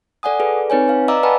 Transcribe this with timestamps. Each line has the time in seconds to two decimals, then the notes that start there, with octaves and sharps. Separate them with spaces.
0.23 A4 D5 F#5 G#5 D#6
0.40 G#4 A4 B4 D5
0.70 C4 D#4 B4 C#5 G#5
0.88 B4 F5
1.08 D5 D#5 F5 A#5 D6 E6
1.23 B4 D5 F#5 G#5 A5 B5